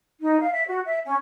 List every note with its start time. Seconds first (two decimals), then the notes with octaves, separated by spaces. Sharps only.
0.20 D#4
0.40 F5
0.51 E5
0.67 F#4
0.84 E5
1.05 C#4